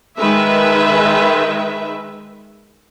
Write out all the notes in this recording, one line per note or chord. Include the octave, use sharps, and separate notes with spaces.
D#3 G#3 B4 E5